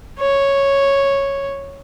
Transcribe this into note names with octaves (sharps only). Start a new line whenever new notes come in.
C#5